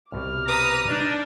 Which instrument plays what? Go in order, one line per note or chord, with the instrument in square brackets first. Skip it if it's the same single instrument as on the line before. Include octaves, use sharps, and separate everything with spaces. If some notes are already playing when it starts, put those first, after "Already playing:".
[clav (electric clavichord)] C2 B2 G3 [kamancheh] D6 F6
[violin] B4 D#6 [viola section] A#5
[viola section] D4 [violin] D#4